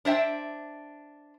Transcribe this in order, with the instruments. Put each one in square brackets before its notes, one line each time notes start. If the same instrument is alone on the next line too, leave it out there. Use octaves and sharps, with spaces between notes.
[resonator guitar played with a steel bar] D4 C5 E5 G5